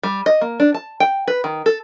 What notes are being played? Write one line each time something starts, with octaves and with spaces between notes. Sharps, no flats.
G3
D#5
A#3
D4
A5
G5
B4
D#3
A4